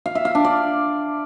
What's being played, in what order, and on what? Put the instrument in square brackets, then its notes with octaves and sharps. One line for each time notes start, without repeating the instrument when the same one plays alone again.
[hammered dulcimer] F5
E5
F5
D4
D5